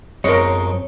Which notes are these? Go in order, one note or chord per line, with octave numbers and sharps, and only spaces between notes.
F#2 G#3 C4 A#4 C#5